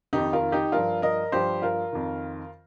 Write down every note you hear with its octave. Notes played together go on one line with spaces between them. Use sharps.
F2 D#3 D#4 G4
F4 A#4
D#4 G4
G2 F3 F4 A#4
A#4 D#5
G2 F3 G4 C5
F4 A#4
F2 D#3